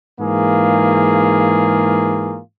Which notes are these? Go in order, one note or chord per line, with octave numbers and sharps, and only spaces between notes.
G#2 E3 A#3 F4 G#4